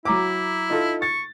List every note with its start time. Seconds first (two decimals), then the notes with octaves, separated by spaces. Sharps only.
0.05 F#3 E4 A#5 D6
0.70 D#4 F4 A4
1.02 C#6 A6